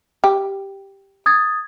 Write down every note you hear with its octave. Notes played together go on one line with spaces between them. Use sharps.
G4
D#6 G#6 A6